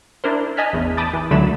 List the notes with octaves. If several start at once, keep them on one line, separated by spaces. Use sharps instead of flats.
D4 E4 A#4 C5
D#5 G#5 A5 F6 F#6 B6
A1 E2
A5 B5 D6 D#6 G6 A6
E3
C#2 D3 F#3 A3 B5 E7